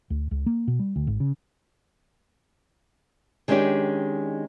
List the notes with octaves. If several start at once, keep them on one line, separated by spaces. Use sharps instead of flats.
D2
C#2
A#3
B2
G3
D2
G#1
C#3
D#3 G#3 B3 C#4 D4 G4